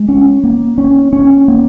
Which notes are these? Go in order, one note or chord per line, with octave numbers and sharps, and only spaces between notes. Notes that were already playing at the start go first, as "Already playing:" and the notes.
Already playing: G#3
C#4
A#3
C#4
C#4
A#3